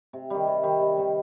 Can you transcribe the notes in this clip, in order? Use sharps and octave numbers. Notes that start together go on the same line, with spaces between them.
C3
D#3 G3
C3
D#3 G3
C3
D#3 G3